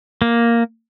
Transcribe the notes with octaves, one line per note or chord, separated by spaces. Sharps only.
A#3